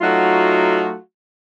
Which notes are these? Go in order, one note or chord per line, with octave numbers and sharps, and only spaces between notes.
F#3 A3 D#4 F4 F#4